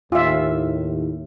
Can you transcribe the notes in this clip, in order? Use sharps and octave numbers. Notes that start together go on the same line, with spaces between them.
D#2 A2 F4 E5